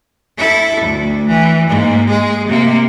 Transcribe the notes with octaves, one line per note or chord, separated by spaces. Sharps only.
E4 A4
D2
E3
G#2 A#3
G#3 G#4
C3 A#3